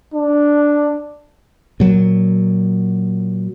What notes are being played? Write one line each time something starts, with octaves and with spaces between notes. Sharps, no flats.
D4
A#2 F#3